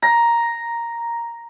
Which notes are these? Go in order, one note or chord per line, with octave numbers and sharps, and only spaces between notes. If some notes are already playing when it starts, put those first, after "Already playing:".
A#5